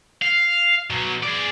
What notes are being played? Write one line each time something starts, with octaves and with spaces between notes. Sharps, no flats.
F5
B2 F#3
G#4 D5